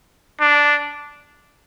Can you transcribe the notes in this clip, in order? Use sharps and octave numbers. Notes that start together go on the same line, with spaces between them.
D4